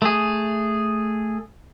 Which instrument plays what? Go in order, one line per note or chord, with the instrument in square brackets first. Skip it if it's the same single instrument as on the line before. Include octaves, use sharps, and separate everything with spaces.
[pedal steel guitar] A3 G#4